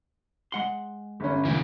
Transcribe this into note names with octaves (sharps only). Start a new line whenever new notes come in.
G#3 F#5 C6
G1 C#4
D2 B2 E3